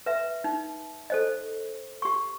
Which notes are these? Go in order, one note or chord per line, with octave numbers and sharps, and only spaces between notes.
B4 E5
D#4
A4 C5 D#5
G4 C#6